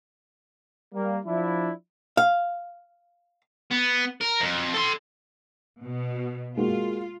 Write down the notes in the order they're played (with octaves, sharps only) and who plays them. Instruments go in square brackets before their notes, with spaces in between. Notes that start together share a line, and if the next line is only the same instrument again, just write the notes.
[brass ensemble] G3 A#3
F3 D4 E4
[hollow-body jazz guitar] F5
[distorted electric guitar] B3
A#4
F2
A4 C6
[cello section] B2
[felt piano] G#3 A#3 F#4 [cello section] F4